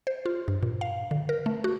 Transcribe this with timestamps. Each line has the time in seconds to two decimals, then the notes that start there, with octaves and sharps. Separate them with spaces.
0.07 C5
0.26 F4
0.48 G2
0.63 A#2
0.81 F5
1.11 D3
1.29 A#4
1.46 A3
1.64 F#4